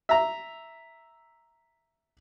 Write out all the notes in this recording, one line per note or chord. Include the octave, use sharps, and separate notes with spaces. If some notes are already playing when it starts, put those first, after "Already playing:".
E5 A#5